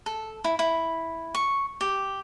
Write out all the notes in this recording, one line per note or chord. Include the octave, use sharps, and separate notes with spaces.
A4
E4
E4
C#6
G4